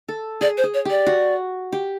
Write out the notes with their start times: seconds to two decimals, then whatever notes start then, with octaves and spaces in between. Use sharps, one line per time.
0.08 A4
0.41 G#4 D5
0.58 C5
0.64 G#4
0.74 C#5
0.85 G4 D5
1.06 F#4
1.72 G4